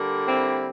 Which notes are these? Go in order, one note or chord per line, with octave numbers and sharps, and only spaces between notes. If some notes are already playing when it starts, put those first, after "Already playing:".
Already playing: D3 G3 A#3
C4 E4